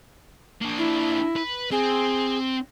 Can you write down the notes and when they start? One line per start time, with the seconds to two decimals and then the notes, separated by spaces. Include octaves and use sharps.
0.62 A#3 D4
0.78 E4
1.36 B4
1.72 C4 G#4